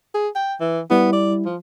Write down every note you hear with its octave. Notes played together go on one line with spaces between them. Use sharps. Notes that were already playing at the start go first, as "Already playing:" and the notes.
G#4
G5
E3
G3 B3 E4
D5
F3